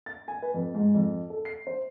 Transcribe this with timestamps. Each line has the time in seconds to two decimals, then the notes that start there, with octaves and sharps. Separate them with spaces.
0.06 A6
0.28 G#5
0.42 B4
0.54 F2
0.75 G#2
0.94 F2
1.30 A4
1.45 C7
1.67 C5